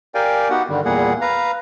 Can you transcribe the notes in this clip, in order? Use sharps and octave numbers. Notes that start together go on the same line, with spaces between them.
G4 A#4 D5 F5 G5 G#5
B3 D#4 F#4 G4 F#5
G2 D3 D#3 G3
E2 A#2 G3 A#3 G#4 F#5
B4 F5 A#5